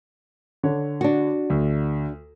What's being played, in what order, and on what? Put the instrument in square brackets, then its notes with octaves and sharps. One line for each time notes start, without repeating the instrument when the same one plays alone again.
[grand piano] D3 C#5
[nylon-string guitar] D4 F#4
[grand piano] D2